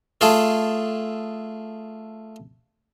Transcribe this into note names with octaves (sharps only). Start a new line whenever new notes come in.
A3 F4 G#4 A4